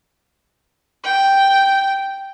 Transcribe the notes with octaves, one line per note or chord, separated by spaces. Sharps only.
G5